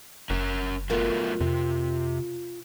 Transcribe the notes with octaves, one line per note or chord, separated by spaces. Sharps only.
F#1 C#4 A#4
F#3 A3 B3 F4 A#4
F2 C3